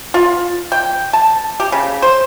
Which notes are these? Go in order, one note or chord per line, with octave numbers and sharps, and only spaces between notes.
F4
G5
A5
G4
C#3
C5